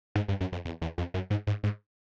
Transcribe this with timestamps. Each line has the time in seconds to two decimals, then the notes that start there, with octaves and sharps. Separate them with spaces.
0.15 G#2
0.28 G2
0.41 F#2
0.52 F2
0.65 E2
0.82 E2
0.98 F2
1.14 F#2
1.30 G#2
1.47 G#2
1.63 G#2